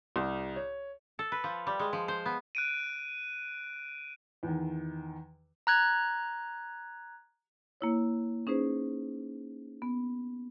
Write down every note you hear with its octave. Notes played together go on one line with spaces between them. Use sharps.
C2
C#5
A4
B4
F3
G3
G#3
F3
C5
B3
F#6 D7 D#7
E2 D#3
A#5 F#6 G#6
A#3 E4 C#5
C#4 D#4 G#4 B4 C5
B3